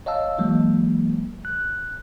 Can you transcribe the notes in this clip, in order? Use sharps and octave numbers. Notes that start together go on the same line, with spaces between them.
C#5 D#5 F5 A5 E6
E3 F#3 G#3 A#3
F#6